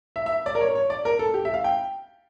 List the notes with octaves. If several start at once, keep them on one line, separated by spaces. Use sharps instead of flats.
E5
E5
D5
A#4
C#5
C#5
D5
A#4
A4
G4
E5
F5
G5